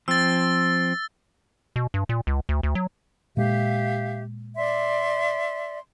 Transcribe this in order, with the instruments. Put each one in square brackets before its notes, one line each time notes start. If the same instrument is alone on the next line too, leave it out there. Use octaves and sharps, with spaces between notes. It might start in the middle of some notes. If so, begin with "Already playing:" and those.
[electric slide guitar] F3 C4 [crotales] E6 A6
[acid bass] B2
G2
A#2
C#2
D2
D2
F#3
[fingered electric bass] A#2 G#3 [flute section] G4 E5 F5
[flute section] D5 E5 C6